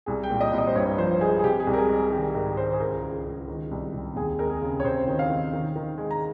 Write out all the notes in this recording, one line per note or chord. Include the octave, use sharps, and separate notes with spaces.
C2 G#4
G5
A#2
D#5
C2
D#5
C5
G2 C#5
F3 C5
G#3 G#4
G#4
C3 G4
G#4
C2
A#4
G#4
G#3
G#4
D#3 G4
G#2 A#4
D#3 C5
G#4
C#2 A#4
C#2
C#2
D#3
C2
C3
D#2 G#4
G#3 A#4
G#4
C#3
C#5
C3 C5
D#3
F5
D#3
D#3
D#3
G#3
A#5